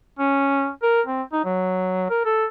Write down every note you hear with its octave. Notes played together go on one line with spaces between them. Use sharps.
C#4
A#4
C4
D#4
F#3
A#4
A4